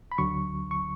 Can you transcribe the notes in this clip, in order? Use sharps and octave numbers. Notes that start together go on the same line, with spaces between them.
B5
D2 D3 F#3 C#6
C#6